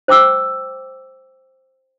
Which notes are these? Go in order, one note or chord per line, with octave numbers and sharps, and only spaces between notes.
C5 G5 D6 E6